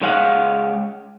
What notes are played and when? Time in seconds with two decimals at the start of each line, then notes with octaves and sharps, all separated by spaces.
0.01 C#2 G#3 C#5 F5 F#5